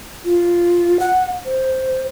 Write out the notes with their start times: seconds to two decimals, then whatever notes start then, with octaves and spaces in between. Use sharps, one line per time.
0.25 F4
1.00 F#5
1.45 C5